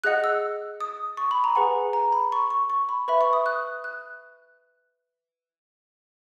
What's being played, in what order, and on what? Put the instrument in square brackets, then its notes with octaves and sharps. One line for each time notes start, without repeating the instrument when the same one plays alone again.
[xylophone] G#4 D#5 F#5 F#6
E6
D#6
C#6
B5
A#5
G#4 B4 F#5 G#5
A#5
B5
C#6
C#6
C#6
B5
B4 E5 B5
C#6
D#6
F#6
F#6